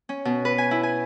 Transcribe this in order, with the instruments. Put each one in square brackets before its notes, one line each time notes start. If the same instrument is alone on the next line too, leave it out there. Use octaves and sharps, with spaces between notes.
[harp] C#4
B2
B4
G#5
E4
G#5